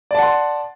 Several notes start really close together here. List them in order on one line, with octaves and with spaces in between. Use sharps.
D5 A5 F#5 C6